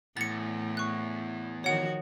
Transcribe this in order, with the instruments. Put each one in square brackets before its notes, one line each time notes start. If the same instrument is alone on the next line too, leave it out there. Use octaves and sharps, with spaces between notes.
[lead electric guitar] E2 [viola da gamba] A2 [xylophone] A6 C#7
[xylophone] C#6 F#6
[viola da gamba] D#3 F3 F#4 [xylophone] C#5 F#5